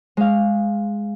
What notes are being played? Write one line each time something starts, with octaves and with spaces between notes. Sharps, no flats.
G#3 F5